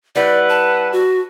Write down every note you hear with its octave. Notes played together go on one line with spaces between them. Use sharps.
G3 E4 B4 D5 F#5
A5
F#4